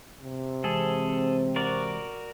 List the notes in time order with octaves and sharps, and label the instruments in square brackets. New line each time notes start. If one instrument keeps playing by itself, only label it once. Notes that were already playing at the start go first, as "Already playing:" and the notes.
[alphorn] C3
[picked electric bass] E3 G#3 [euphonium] C4 [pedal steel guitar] G#4 A4
[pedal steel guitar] F#4 A#4 D5